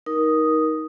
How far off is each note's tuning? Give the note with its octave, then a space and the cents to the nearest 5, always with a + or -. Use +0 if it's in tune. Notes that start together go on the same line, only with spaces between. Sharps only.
D#4 +15 A#4 +20 D#6 +0